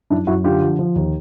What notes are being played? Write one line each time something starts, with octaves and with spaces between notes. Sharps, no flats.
F#2 D4 E4
F#2 E4 F#4
D3 F4 G4
F3
F3
D#2